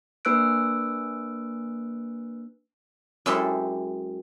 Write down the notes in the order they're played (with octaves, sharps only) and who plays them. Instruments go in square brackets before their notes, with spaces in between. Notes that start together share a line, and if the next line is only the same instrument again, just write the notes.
[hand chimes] A#3 D4 B4 E6 F#6 D7
[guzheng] F#2 G#3 E4 G4 A4 C5